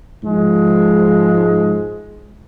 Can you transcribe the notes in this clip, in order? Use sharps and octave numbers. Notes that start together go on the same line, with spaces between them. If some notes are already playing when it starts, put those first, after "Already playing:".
G#2 F3 G#3